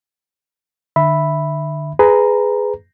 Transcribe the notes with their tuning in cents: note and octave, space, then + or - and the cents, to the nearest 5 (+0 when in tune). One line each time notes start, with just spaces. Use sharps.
D3 +35 E5 +0 B5 +0
G#4 +5 B4 +20 A#5 +0